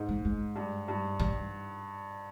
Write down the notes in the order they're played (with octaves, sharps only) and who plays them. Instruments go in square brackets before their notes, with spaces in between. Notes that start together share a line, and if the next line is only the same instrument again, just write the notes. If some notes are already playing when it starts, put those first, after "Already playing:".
Already playing: [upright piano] G#2
[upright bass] G#3
G#3
[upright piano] G2
G2
[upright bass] G3